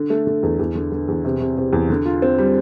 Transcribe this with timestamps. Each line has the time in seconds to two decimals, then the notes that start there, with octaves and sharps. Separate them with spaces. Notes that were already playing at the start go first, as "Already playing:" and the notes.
Already playing: D3
0.10 A3
0.27 D3
0.43 E2
0.59 E2
0.75 D3
0.92 D3
1.08 E2
1.25 C3
1.40 C3
1.58 C3
1.73 E2
1.90 D3
2.06 F4
2.22 C4
2.38 G3